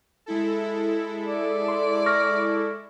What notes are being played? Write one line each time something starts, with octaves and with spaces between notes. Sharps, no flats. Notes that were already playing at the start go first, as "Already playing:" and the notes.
G#3 E4 A4
D5
C6
C#6 F6 A#6